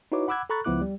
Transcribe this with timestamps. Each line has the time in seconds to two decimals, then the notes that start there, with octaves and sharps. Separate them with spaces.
0.12 D#4 E4 F#4 B4 C#5 D6
0.28 F#5 B5 D6 E6 F#6 G#6
0.50 A4 A#5 B5 C#6 F#6 A6
0.64 C#2 F3 B3 E4 D6 F#6
0.81 G3